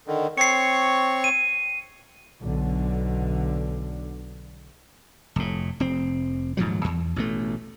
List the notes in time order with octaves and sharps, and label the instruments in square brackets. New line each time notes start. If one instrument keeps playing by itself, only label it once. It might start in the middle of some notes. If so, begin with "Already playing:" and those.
[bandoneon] D3 D#3
[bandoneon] C4 C#5 C#6 [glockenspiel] C7 C#7
[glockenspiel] D#7
[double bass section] B1 D3
[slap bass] F1 A2
F1 C4
D#1 G#2 F3 F#3
E2
A1 B2 A3